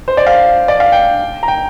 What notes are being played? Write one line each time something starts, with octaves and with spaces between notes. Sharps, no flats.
C5
D5
F5
D5
F5
G5
A#5
G5